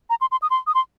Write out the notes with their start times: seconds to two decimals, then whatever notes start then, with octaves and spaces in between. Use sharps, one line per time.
0.10 A#5
0.21 C6
0.31 C6
0.42 D#6
0.50 C6
0.67 D#6
0.75 C6